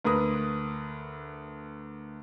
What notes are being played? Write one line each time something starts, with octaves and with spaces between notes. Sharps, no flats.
D2 A#4 B4 D#6